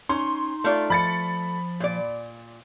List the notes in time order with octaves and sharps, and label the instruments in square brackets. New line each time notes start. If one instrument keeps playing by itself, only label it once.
[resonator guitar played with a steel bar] C#4 [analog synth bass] D#4 [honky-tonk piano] C6
[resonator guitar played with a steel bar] A3 F4 D5
[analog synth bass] F3 [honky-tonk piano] B5 A6 C#7
[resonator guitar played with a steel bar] A#2 D5